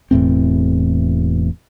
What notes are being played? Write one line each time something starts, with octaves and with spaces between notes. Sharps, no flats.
E1 E2 A2 C4